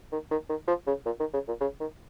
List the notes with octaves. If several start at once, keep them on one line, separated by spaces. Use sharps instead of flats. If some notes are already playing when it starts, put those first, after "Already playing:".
D#3
D#3
D#3
F3
C#3
A#2
D#3
C#3
A#2
C#3
D#3